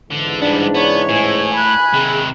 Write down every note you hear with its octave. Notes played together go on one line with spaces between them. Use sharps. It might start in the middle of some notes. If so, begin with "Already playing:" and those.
C#2 G#2 D3 E3
G2 B3 D4
B3 C#5
A2 G#5
B5 F#6
C3 D#3 G#4